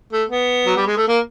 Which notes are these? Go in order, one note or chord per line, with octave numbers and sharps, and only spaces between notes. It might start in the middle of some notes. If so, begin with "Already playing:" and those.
A3
B3
F#3
G3
G#3
A3
A#3